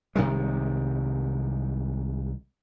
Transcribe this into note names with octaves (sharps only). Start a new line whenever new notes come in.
C2 C3 D#3 G#3